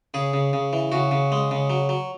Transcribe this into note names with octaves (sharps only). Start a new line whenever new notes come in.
C#3 G#4
C#3
C#3
E3
C#3 F#4
C#3
G#3
C#3
F#3
F#3